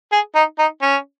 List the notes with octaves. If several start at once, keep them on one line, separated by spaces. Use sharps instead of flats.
G#4
D#4
D#4
C#4